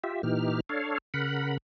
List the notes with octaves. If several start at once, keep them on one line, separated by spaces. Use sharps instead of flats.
F4 G4 E5
A#2 E3 D#4 G4 F6
D4 A4 C#5 F5
C#3 A#4 F#5 B5